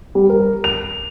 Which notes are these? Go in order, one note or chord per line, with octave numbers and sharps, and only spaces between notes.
G3
A#4
F7